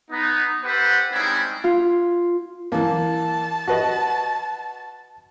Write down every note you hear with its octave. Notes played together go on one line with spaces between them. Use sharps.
B3 D#4
G4 A4 B4 C5 F#5
G3 G#3 C4 C#4 D#4 E4
F4
E3 A#3 A5
F#4 B4 D#5